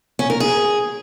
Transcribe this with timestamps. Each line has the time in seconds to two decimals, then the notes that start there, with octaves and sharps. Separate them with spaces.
0.19 C#4
0.30 A#4
0.40 G#4